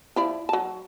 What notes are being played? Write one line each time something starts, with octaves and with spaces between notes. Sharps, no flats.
F3 E4 D5
F#3 A5